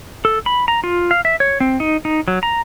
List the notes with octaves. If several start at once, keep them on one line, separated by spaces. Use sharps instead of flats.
A4
B5
A#5
F4
F5
E5
C#5
C4
D#4
D#4
F#3
A#5